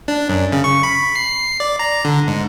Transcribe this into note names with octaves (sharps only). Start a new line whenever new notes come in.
D4
F#2
C#3
C#6
B5
C7
D5
A#5
D3
G#2